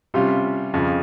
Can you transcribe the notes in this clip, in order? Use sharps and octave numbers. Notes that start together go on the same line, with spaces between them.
C3 G3 C#4 F4
F2 C#3 F3